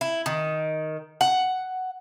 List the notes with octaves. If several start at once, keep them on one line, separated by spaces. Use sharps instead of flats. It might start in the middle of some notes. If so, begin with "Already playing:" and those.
E4
D#3
F#5